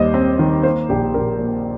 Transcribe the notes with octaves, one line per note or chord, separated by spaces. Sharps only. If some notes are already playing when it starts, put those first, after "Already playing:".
Already playing: D#2 G3 C5 D#5
C4
D#3
A#3 C5
A#1 G4
A#1 A#4
A#2